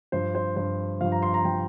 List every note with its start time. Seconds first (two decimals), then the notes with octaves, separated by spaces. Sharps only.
0.12 G2 F3 C5
0.35 C5
0.56 G2 F3 C5
1.01 F3 F5
1.04 G2
1.12 A#5
1.23 C6
1.34 A#5
1.45 F3 G5